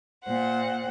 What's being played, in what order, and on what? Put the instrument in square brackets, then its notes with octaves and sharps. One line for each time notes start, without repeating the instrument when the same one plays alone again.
[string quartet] A#2 C5 F#5